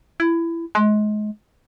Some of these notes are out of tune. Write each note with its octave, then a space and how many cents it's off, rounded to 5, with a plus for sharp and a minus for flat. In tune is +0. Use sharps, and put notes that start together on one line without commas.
E4 +20
G#3 +30